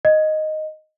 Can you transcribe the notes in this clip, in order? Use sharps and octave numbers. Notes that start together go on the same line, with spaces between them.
D#5